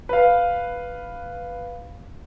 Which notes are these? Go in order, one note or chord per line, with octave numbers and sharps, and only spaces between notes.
B4 F5